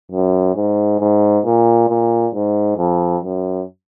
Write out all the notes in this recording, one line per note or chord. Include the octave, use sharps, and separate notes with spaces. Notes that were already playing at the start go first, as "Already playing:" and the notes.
F#2
G#2
G#2
A#2
A#2
G#2
F2
F#2